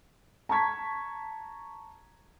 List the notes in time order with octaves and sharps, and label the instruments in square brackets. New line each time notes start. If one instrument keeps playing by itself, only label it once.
[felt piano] A5 A#5 C#6 G#6 B6